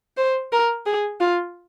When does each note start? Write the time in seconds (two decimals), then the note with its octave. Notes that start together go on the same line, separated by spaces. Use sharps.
0.17 C5
0.52 A#4
0.86 G#4
1.20 F4